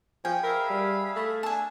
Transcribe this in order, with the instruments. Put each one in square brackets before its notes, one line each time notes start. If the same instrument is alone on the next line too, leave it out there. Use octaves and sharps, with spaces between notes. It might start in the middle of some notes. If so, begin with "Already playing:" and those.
[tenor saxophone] F3 [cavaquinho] G5 [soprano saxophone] G#5 [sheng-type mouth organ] C#6 G6
[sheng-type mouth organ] G#4 E5 F5 [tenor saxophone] A#4 [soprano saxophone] B5
[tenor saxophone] G3
A3
[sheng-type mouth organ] D4 E6 [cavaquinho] G#5 A5